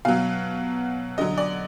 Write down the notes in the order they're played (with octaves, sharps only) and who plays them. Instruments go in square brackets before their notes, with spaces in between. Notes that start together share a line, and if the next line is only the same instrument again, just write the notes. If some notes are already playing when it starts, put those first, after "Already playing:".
[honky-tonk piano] B2 F#3 F5
D3 F#3 D#5
D5